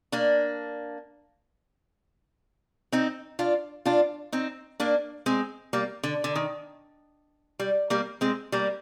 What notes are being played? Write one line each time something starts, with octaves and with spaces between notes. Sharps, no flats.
A#3 D4
C4 D#4
D4 F4
D4 F4
C4 D#4
A#3 D4
G#3 C4
G3 A#3
D3
D3
D#3
G3
G3 A#3
G#3 C4
G3 A#3